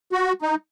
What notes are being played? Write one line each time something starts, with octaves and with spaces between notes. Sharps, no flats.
F#4
D#4